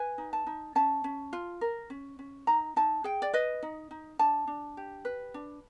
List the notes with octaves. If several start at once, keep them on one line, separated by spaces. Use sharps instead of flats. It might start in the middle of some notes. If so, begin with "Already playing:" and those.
Already playing: B4 G#5
D#4
A5
D#4
C#4 A5
C#4
F4
A#4
C#4
C#4
D#4 A#5
D#4 A5
G#4 G5
D5
B4 D#5
D#4
D#4
D4 A5
D4
G4
B4
D4